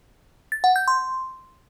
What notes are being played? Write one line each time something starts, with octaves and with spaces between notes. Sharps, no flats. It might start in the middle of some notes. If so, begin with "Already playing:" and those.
A6
F#5
G6
C6